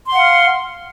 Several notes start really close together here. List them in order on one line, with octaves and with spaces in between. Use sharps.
C6 F#5 F5 F6